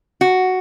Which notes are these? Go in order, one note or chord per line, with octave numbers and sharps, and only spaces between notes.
F#4